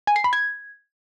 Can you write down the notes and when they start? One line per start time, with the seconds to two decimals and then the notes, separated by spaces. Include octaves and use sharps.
0.07 G#5
0.16 C7
0.24 B5
0.33 G#6